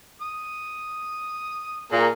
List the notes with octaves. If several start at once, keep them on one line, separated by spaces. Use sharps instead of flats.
D#6
A#2 A#3 G#4